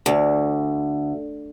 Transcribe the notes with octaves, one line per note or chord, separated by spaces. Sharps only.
D2